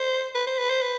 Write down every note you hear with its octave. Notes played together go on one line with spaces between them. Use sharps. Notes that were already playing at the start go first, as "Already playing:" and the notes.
Already playing: C5
B4
C5
B4
C5
B4